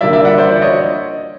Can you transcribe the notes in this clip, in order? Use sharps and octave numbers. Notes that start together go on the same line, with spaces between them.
D3 G3 A#3 D5 E5
D5 E5
E5 F#5
C5 D5
C5 D5
C#5 D#5